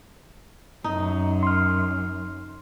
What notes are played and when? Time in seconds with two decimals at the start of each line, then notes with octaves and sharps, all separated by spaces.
0.84 F#2 D#4
1.43 C6 F6